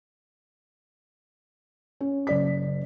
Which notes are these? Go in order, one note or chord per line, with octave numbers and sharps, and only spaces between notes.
C#4
F#1 D5 B6